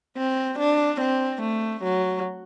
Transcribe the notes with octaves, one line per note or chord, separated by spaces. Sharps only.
C4
D4
C4
A3
F#3